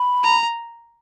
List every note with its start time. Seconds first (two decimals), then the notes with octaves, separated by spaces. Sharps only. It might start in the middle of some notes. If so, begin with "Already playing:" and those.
Already playing: B5
0.23 A#5